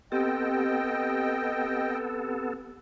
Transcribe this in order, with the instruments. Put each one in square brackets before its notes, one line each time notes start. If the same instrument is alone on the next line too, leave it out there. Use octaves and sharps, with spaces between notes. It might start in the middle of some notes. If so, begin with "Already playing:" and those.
[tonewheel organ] B3 A4 [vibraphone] C4 G4 [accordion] D#5 G5